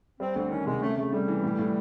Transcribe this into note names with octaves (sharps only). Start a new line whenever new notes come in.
G3 C4
D2 C4
D#3 C#4
C3 G#3
A3 C#4
C#3 A3
G3 A3
E3
A2
A2